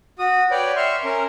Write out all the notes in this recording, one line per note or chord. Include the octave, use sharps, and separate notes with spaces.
F#4 D#6
B4 C#5 D5 G5
E5 C6 C#6 F6
C#4 A#4